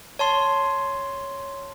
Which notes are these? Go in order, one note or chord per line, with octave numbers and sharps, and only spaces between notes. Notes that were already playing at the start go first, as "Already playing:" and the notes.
C#5 A5 C6